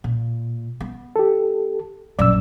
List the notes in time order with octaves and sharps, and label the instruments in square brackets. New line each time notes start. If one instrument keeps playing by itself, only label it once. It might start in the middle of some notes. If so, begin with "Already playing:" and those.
[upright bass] A#2
B3
[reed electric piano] G4 A4
[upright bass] A#1 F#2 [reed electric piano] D5 E6